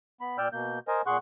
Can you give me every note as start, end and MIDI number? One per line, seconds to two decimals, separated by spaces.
0.21 0.37 59
0.21 0.37 83
0.38 0.48 46
0.38 0.48 74
0.38 0.48 79
0.38 0.48 88
0.38 0.48 89
0.38 0.48 91
0.53 0.79 47
0.53 0.79 58
0.53 0.79 91
0.88 1.02 70
0.88 1.02 72
0.88 1.02 75
0.88 1.02 80
1.07 1.17 46
1.07 1.17 68
1.07 1.17 78
1.07 1.17 84
1.07 1.17 85
1.07 1.17 90